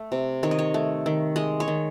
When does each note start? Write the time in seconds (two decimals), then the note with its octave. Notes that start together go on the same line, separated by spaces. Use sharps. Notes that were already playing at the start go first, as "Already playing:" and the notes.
Already playing: A3
0.12 C3
0.43 D#3 C#5
0.51 D#5
0.59 C#5
0.74 A3
1.06 D#3
1.36 G#3 D#5
1.60 C#5
1.68 D#3